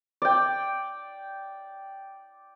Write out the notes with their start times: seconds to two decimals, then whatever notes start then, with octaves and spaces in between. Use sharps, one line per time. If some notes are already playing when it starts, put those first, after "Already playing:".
0.22 D5 G5